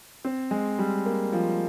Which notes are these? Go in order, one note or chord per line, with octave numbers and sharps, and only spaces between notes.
C4
G#3
G3
A#3
F3